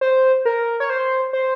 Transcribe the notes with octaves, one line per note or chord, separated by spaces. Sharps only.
C5
A#4
C#5
C5
C5